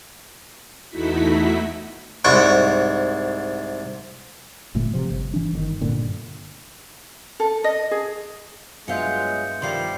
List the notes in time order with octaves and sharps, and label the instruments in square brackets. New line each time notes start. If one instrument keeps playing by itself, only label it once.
[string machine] E2 A3 D#4 E4 F#4 B6
[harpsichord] C2 G#2 F#5 G5 C#6
[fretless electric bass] G1 A#2 D3 A3
C3 F3
G1
E3 D4
G1 D3 D#3
G2 A#2 D3
[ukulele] A4
D#5
G#4
[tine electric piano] G2 B3 E5 [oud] F#3 F4 [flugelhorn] G#3 [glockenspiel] G6 C#7
[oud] D#3 F3 [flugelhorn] G3 [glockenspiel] C6 C7